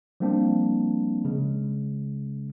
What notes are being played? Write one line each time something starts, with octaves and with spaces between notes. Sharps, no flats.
F3 G3 A#3 C4 D4
C#3 G#3